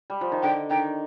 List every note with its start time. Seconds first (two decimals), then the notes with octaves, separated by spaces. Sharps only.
0.10 G3
0.21 F3
0.32 D#3
0.43 D3 G5
0.70 D#3 G5